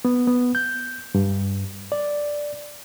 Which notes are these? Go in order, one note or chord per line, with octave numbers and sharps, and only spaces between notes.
B3
B3
G6
G2
D5